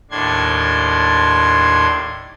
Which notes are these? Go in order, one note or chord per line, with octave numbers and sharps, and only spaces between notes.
D#2 A2 D4 C6 G#6